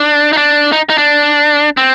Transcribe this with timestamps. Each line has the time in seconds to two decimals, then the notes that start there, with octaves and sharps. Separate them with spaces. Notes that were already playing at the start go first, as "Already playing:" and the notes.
Already playing: D4
0.33 D#4
0.37 D4
0.72 D#4
0.89 D#4
0.98 D4
1.77 C4